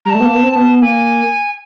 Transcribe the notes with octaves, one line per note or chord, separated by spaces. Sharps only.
G3 A3 A5 A#5
B3
A#3
B3
C4
B3
B3
A#3 G#5